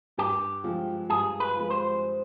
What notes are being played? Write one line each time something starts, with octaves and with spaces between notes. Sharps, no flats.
G2 G4
F3 G#3
G2 G#4
B4
F3 G#3
C5